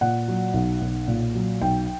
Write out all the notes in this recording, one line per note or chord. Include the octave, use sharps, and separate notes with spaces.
A#2 F#5
F#3
B1
B1
A#2
F#3
B1 G5